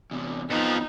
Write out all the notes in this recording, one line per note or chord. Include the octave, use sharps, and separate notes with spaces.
E2 C3
F2 F3 B3 D#4